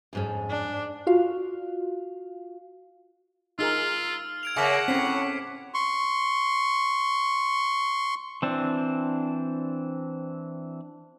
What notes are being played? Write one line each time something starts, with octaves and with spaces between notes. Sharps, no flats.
F2 G#2 C#4
D4
F4 F#4 F5
D#4 F4 G#4 A#4 E6 F6
G#6 D7 F7
C#3 A#3 E5 F#5 C#6 D6 B6
A2 C4 C#4 B6 C7
C6 C#6
E3 C4 D4